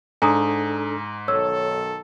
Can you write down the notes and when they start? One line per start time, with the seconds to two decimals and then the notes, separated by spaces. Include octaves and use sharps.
0.22 G#2 D4 A4 G#5 A#5 D#6
1.28 B1 D#3 A4 C#5 E6